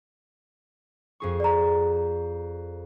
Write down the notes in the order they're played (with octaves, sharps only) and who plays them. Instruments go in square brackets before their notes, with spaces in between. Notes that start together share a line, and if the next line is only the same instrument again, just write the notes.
[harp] F2 G#4 C#6
[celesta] D5 A#5